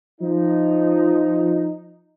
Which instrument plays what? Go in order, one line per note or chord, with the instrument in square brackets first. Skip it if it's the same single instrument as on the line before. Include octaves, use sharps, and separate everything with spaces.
[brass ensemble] F3 D#4